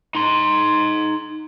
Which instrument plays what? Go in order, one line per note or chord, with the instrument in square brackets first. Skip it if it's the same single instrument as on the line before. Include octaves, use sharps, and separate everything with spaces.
[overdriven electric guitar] D#4 C6